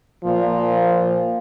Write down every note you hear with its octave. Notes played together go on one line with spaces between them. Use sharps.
A#2 F3